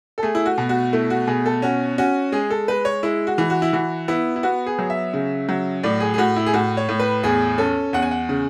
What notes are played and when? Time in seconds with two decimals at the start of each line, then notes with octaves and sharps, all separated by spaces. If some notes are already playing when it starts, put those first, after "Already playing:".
0.18 A4
0.23 A3 G#4
0.35 E4
0.46 F#4
0.58 B2
0.69 F#4
0.93 A3 E4
1.10 F#4
1.27 B2 G#4
1.46 A4
1.62 C#4 F#4
1.98 C#4 F#4
2.32 G#3 G#4
2.50 A4
2.68 G#3 B4
2.85 C#5
3.03 G#3 E4
3.27 F#4
3.38 E3
3.50 F#4
3.62 E4
3.73 E3 F#4
4.08 B3 E4
4.36 E4
4.43 B3 F#4
4.66 G#4
4.79 F#3
4.90 E5
5.13 C#3
5.49 F#3
5.83 A2 D5
6.00 G#4
6.14 G#4
6.18 A2 F#4
6.36 E4
6.46 G#4
6.54 A2 F#4
6.77 C#5
6.89 A2
7.00 B4
7.23 E2 G#4
7.58 C#4 A4
7.93 E2 F#5
8.02 G#5
8.11 F#5
8.29 C#3